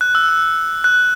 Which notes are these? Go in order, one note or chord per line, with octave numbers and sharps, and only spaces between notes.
F#6
E6
E6
F#6